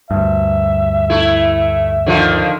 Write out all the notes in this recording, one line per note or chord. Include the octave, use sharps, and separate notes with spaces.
D2 G2 E5
A3 E4
D3 D#3 F3